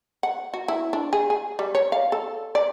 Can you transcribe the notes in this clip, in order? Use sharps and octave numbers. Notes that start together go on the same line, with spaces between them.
F#5
F#4
E4
D4
G#4
G#4
G3
C#5
F5
A4
D5